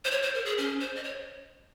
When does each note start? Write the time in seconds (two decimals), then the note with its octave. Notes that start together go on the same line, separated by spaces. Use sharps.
0.05 C5
0.11 C#5
0.22 C5
0.34 A#4
0.45 G#4
0.58 C#4
0.80 C5
0.96 D#5
1.04 C#5